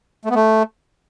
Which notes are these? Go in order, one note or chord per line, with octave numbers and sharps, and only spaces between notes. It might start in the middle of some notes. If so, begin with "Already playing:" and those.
A3
B3
A3